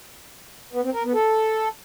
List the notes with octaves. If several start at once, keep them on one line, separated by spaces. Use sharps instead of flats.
B3
C4
A#4
B3
A4